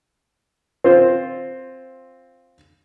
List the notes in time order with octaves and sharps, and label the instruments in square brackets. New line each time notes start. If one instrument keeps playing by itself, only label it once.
[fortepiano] C4 F4 C5